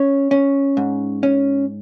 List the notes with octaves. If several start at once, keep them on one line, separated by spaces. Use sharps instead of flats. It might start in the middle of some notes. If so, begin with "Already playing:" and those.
Already playing: C#4 C#5
C#4
G#2
C#4